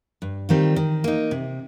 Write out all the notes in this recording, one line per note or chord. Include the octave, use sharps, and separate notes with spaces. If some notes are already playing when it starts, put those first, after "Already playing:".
G2
D#3 G3 C4 F4
D#3
A#3 D#4
C3